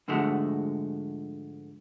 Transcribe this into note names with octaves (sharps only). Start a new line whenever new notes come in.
G#2 D3 F3 G#3 A3 F#4